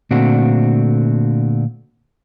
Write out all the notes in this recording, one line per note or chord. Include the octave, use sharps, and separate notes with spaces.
A#2 D3 A3 C4 D4 F#4